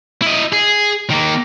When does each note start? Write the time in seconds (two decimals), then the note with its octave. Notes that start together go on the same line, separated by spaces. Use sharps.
0.22 E4 D#5
0.53 G#4
1.10 D#3 A#3